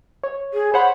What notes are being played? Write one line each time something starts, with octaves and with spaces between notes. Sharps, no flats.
C#5
G#4
C5 C#5 F#5 B5